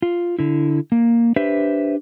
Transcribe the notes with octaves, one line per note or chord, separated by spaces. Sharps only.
F4
D3 E4
A#3
D4 G4 B4 C5 E5